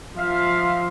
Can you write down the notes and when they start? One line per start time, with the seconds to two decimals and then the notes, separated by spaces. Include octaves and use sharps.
0.18 F3 E5 F5